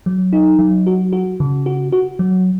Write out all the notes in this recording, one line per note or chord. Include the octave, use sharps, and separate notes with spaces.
F#3
D#4
F#3
F#4
F#4
C#3
F#4
F#4
F#3